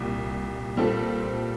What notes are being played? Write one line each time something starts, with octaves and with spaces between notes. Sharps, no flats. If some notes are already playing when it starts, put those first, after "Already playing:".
Already playing: C2 A#2 G3
A#2 G3 C4 F4 A4